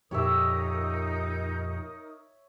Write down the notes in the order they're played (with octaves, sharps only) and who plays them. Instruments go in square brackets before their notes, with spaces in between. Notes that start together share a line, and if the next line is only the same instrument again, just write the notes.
[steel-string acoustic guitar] F2 A#2 G4 [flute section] D#4 A#4 D#6 [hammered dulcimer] C#5 E5